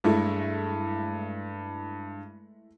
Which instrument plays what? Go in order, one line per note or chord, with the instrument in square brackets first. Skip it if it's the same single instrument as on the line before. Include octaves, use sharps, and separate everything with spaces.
[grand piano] G2 [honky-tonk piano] G#3 A3 E4